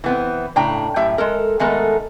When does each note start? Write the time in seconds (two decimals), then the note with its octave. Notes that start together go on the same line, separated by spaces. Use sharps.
0.04 E3 B3 C4
0.56 A2 C#3 D4 G5 A#5
0.96 F#2 A2 G4 E5
1.18 G#3 A4 A#4
1.60 D#3 G#3 A3 B3 A4 A#4